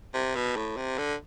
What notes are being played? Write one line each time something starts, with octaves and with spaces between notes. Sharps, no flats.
C3
B2
A2
C3
D3